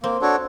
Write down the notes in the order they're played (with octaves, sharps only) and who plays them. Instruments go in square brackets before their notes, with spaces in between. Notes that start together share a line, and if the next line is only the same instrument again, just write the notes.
[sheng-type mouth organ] A#3 [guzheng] C4
[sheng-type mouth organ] D4 F#4 A4 C#5